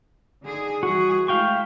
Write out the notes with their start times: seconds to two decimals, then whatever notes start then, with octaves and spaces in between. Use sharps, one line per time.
0.44 D3 D#4 G#4
0.83 E3 G3 F#4 G#4
1.28 G#3 A3 E4 F5 G5 C#6